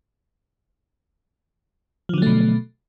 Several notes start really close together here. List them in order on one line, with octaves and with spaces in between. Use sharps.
F3 D3 F#3 A3 B2